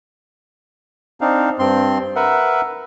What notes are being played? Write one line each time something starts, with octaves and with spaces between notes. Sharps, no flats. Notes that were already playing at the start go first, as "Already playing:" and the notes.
C4 D4 D#4 F5
G2 C4 C6
A#4 B4 E5 F#5